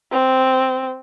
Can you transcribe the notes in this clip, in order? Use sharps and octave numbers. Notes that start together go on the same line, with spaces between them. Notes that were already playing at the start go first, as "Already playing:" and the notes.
C4